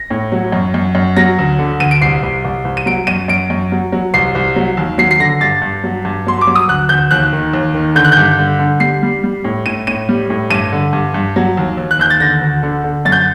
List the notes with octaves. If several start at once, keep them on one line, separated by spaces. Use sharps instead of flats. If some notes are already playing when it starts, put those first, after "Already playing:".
Already playing: A#6
A2
F#3
F#2
F#2
F#2
F#3 A#6
D2
D3
D2 D#7
D7
C2 C7
C2
C2
C2
D#7
F#3 D7
F#2 D#7
F#2 D7
F#2
F#3
F#3
C2 C7
C2
F#3
D#2
F#3 C7
C7
D3 A#6
G2 A6
G2
F#3
G2
F#3 C6
D6
F#3
D#6
D2 F#6
D2 G6
D#2 F#6
D#3
D#2
D#3
D3 G6
F#6
G2 G6
D3
D3
G3 C7
G3
G3
A2
A2 D#7
A2 D#7
G3
A2
G2 D#7
D3
G2
G2
F#3
D#2
D#2
F#6
D#2 G6
A6
D3 A#6
D2
D3
D3
F#2 A6
G6